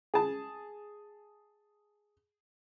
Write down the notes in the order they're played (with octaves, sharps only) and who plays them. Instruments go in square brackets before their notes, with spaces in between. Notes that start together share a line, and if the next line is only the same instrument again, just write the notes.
[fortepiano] G#4 A5